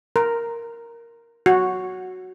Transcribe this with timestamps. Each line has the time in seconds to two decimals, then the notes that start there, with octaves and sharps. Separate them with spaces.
0.16 A#4
1.46 F#4